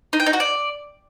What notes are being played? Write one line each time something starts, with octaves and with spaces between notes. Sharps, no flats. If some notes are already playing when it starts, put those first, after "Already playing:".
D#4
G5
D#4
F#4
D5